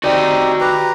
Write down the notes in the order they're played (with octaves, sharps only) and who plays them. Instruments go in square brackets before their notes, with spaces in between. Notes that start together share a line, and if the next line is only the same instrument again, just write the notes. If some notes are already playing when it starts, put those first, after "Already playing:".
[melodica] C4 D#4 G4 [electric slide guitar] F#4 D5
[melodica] G4 B4 A#5